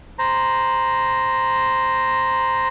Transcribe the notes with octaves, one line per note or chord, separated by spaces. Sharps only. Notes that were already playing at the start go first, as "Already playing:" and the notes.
C5 A#5